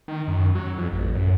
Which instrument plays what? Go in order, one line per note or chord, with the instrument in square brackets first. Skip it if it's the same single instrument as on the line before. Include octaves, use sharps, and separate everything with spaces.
[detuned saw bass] D#3
F#2
F#3
F2
A1
F#2